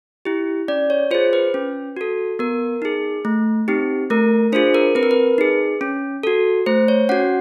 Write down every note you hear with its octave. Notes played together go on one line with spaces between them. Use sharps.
E4 G4
C#4 D5
C#5
F4 G#4 C5
B4
C#4
F#4 A4
B3 A#4
D#4 G#4
A3
C4 D#4 G4
A3 A#4
D4 F4 G#4 C5
A#4
C4 B4
A#4
B4
D#4 G#4
C#4
F#4 A4
A3 C5
C#5
C#4 F#4 F#5